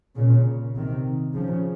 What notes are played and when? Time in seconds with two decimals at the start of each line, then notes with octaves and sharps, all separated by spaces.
0.16 A#2 C#3
0.75 C3 D#3
1.34 C#3 F3